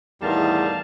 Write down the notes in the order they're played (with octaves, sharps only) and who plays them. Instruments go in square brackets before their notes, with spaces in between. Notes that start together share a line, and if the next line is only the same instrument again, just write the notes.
[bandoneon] E2 [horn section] A2 D#3 G3 [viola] G#4 A#4 [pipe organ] F5 A5